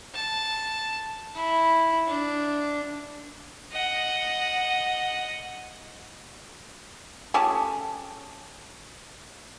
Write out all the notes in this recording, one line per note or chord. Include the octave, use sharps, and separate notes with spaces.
A5
E4
D4
D#5 F#5
A3 C#4 F4 G4 G#4 A5